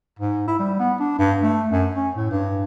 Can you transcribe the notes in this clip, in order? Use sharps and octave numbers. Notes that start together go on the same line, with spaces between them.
G#2
E4
G3
B3
D4
G2
A3
F#2
C#4
A2
G2